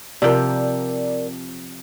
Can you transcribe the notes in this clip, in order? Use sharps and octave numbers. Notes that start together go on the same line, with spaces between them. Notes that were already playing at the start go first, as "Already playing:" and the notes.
C3 F3 A#4 D5 G5